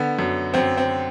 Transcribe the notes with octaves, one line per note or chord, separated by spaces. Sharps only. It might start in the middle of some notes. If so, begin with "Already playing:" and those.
Already playing: D3 B3
F#2
F#2 C4
C4